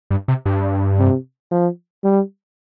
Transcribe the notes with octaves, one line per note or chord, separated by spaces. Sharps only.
G2
C3
G2
C3
F3
G3